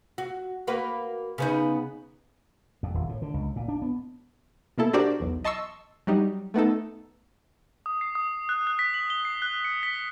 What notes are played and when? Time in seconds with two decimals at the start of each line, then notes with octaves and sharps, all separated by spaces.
0.18 F#4
0.67 A#3 F#4 B4
1.38 C#3 B3 D#4
2.83 F2
2.94 D#1
3.09 A2
3.22 D3
3.34 C#2
3.56 A#2
3.68 D4
3.82 B3
4.78 B2 A#3 E4 A4
4.93 D4 F#4 G4 A#4 C5 D5
5.20 B1 E2
5.44 D#5 A5 C6 C#6 E6
6.07 F#3 G3 D#4
6.54 A3 B3 D#4 A4
7.86 D#6
8.01 C7
8.15 D#6
8.49 F#6
8.67 F#6
8.79 B6
8.94 F#7
9.10 G7
9.25 C7
9.42 F#6
9.65 C#7
9.83 B6